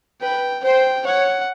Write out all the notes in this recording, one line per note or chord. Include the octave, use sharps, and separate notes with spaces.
B4 G5
C5 G5
C#5 F#5